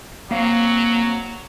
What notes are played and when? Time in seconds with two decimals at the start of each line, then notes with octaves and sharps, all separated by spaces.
0.31 F#3 A#3 C4 F5